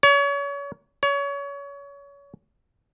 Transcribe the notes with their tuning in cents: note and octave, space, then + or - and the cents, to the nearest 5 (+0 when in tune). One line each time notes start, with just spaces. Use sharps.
C#5 +35
C#5 +30